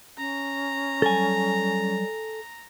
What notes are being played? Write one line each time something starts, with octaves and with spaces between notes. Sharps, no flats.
C#4 A#5
F#3 G3 A4 G#5